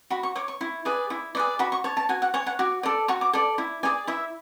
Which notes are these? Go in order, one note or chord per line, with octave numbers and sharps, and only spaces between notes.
F#4 B5
C#6
C#5 D6
C#6
E4
G#4 B4 D5
E4
G#4 B4 D5
F#4 B5
C#6
C#5 A5
A5
F#4 G#5
F#5
C#5 G#5
F#5
F#4 D6
A4 D5
F#4 C#6
D6
A4 D5
E4
G#4 D5 G#5
E4 E5